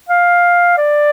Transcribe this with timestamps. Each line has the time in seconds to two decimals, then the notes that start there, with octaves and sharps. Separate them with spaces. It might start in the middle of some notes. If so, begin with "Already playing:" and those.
0.09 F5
0.77 D5